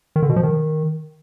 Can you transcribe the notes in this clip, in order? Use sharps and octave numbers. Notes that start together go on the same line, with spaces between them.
D#3
D3
B2
F3
D#3